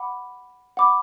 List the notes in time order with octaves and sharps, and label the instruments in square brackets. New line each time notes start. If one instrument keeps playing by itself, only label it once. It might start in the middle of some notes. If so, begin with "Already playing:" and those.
Already playing: [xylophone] F#5 B5 D6
F#5 B5 D6